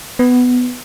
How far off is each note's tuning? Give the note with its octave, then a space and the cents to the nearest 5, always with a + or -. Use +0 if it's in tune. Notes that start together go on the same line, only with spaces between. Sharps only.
B3 +10